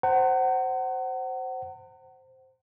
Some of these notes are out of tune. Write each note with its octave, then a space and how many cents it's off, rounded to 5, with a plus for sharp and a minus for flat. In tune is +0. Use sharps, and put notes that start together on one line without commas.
C5 +0 F#5 +25 A#5 -45